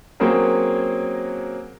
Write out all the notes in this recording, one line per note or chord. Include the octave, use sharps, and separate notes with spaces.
F#3 A#3 C4 C#4 G#4 A#4